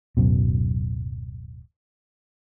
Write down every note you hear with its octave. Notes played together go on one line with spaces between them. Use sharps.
D1 F#2 B2